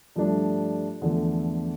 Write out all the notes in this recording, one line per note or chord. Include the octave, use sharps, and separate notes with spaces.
G2 F3 A3 D4
E2 D3 F3 A3